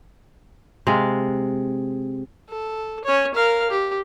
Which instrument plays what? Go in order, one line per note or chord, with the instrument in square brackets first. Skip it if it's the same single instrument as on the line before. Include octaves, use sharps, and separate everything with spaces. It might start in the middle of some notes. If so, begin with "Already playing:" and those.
[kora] C3 G#3 F5
[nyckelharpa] A4
C#4 C#5
A#4 F5
G4